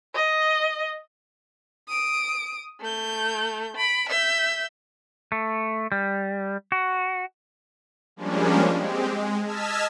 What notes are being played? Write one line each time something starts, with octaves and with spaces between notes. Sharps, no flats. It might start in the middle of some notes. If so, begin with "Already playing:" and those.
D#5
D#6 D7
A3 G6
B5 D7
E5 G6
A3
G3
F#4
F3 G3 G#3 A#3 C#4 D4
G#3 C4 G4
G#3
D#5 A5 E6 F6 G#6 B6